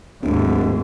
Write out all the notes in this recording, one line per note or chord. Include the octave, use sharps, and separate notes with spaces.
D1 D#2 G#2